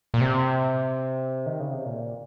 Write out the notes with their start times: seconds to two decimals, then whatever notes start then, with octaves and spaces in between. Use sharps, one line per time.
0.14 A#2
0.21 C3
1.46 D#3
1.60 C#3
1.73 C3
1.86 A#2